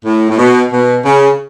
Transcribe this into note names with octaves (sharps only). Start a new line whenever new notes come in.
A2
A2
B2
B2
C#3